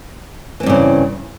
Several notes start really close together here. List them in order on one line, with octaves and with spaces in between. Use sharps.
E3 C4 G2 C#3